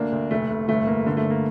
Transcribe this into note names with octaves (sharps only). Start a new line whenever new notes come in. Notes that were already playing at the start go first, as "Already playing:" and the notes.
Already playing: D2 A#3 D4
D2
F1 A3
F1
G1 A3
G1 A#3
D3
A3
D3
A#3